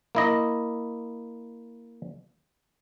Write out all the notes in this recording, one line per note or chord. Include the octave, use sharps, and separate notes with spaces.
A#3 E4 D#5